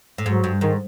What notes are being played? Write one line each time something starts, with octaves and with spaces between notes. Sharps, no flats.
A2
G#2 F#3
G2
G#2 D#3